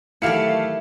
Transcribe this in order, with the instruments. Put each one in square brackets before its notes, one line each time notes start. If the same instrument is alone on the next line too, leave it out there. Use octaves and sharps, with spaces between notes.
[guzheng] D#3 E3 F#3 [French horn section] A3 [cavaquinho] E4 G4 [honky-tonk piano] F5 C#7